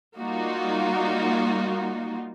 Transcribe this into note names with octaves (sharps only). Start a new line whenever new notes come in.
G3 A#3 D#4 F4 F#4